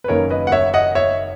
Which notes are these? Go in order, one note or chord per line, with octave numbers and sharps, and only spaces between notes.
B4
F#1 F#2 D#3 A#3 C#4 A#4 C#5
B4 D#5
F#5
C#5 E5
D#5 F#5
C#5 E5